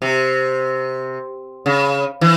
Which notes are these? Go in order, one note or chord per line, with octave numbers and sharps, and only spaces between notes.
C3
C#3
E3